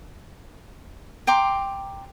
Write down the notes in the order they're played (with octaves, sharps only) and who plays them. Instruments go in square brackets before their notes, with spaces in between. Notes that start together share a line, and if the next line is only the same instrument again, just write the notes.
[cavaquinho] G5 A#5 C6 D6